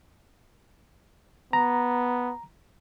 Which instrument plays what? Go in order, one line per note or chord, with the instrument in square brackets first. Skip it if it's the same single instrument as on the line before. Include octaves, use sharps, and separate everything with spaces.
[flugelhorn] B3 [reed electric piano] A#5